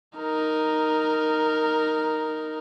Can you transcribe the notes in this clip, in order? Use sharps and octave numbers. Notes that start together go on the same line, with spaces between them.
D#4 A#4